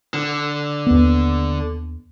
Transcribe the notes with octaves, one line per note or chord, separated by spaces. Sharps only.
D3
D#2 B3